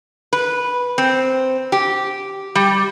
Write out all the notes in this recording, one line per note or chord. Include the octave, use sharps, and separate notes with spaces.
B4
C4
G4
G3